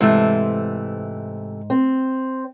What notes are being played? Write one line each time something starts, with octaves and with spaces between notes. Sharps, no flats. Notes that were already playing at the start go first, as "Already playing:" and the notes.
G#2 C3 E3 A3
C4